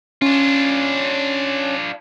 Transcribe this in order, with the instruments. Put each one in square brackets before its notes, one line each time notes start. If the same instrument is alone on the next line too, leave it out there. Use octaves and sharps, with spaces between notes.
[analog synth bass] C#4 [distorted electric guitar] D4 F4